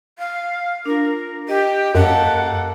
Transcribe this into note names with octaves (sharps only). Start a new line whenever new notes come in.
F5
D4 F4 A#4
G4 D#5
F#2 A#3 A4 F#5